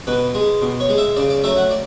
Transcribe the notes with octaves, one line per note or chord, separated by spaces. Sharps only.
B2 B4
G#3
B2
C#5
G#3
E5
C#3 D5
D5
F#3 A3 E5
F#5
D5